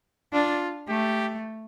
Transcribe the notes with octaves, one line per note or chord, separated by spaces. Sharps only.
D4 F4
A3 G4